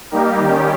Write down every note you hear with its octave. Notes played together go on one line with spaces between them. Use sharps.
G3 A#3 D#4 G4 A#4
D#3 G3 C#4 G4